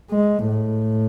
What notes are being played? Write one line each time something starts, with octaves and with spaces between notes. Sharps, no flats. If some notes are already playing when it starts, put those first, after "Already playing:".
G#3
A2